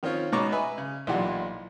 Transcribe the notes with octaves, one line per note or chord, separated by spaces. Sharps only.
D#3 C4 C#4 F4 C#5
G#2 B2 C#4 A#5 C#6 D6
B4 D#5 E5 G#5 B5
C#3
B1 A#2 E3 G4 D5 F#5